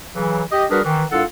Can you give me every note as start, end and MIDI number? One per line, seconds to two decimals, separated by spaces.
0.14 0.41 49
0.14 0.41 52
0.14 0.41 54
0.51 0.64 67
0.51 0.64 75
0.70 0.79 55
0.70 0.79 62
0.70 0.79 66
0.70 0.79 68
0.70 0.79 70
0.70 0.79 71
0.84 1.03 51
0.84 1.03 52
1.11 1.23 36
1.11 1.23 43
1.11 1.23 65
1.11 1.23 69
1.11 1.23 78